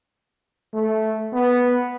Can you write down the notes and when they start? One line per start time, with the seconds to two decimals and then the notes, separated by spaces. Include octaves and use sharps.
0.74 A3
1.33 B3